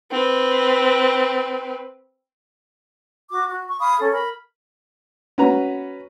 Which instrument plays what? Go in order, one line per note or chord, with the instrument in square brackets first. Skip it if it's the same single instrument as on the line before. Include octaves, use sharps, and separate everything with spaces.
[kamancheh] C4 B4
[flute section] F#4 D6
F#4
C#6
F5 B5 D#6
C#4 A4
A#4 B5
[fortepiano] C#4 F#4 B4 A#5